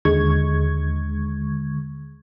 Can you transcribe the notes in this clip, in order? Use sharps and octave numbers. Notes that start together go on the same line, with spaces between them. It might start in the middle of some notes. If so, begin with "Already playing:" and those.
D#2 D3 G#3 C#6 G#6